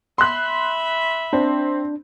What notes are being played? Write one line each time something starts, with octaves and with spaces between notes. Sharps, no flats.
E5 B5 C6 F#6
C4 D4